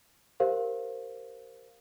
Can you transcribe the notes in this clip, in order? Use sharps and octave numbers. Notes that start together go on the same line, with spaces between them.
G4 A#4 C5 F5